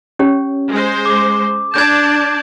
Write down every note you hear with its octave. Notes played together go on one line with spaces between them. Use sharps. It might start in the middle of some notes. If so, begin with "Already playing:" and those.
C#4 G4 C#5
G#3 C5
D6
D4 D5 A5 G6 G#6